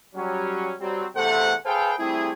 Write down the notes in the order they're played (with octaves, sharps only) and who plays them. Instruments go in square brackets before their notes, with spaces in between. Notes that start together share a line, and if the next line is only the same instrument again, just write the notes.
[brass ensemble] F#3 G3 C#4
F#3 G3 C4
E2 C3 A3 A4 C5 F#5
G#4 A4 B4 C5 F5 G5
G3 A3 C4 E4 G#4